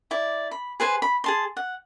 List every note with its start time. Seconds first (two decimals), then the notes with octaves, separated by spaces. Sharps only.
0.11 E4 D5
0.51 B5
0.80 G#4 B4 C5 G#5
1.02 B5
1.24 G#4 A5 C6
1.57 F#5